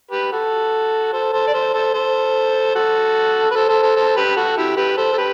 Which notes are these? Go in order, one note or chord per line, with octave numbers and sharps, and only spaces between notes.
G4 B4
F#4 A4
A4 C5
A4 C5
D5
A4 C5
A4 C5
A4 C5
F#4 A4
B4
A4 C5
A4 C5
A4 C5
A4 C5
G4 B4
F#4 A4
E4 G4
G4 B4
A4 C5
A4
G4 B4